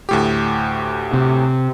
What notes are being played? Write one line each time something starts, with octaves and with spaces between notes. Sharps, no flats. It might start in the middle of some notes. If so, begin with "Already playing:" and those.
D2 A2 G4
C3